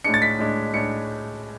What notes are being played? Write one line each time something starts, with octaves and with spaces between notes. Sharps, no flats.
A2 G#3 D4 C#7
A6
B6
A2 G#3 D4
A2 G#3 D4 C#7